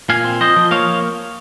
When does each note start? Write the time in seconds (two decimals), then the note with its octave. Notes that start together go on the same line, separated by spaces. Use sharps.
0.09 A#2 F5 G#5
0.24 C4
0.41 F3 C5 D#5
0.56 F3
0.71 A#3 C#5 F5